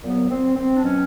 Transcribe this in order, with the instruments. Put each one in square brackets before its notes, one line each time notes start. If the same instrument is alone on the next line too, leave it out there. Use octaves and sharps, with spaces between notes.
[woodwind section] C2 A#2 F#3 B3
C4
C4
D4
B2 F#3 C#4